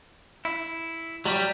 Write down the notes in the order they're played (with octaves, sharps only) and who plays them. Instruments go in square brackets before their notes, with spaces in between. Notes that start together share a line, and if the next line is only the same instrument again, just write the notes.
[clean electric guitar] E4
[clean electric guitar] F#3 [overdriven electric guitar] G3